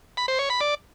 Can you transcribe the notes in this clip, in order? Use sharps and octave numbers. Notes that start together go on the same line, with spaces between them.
B5
C5
C#5
B5
D5